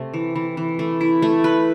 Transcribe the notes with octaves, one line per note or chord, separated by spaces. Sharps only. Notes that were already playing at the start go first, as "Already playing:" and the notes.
Already playing: C3 A3
E3
E3
E3
A3
E4
A3
B4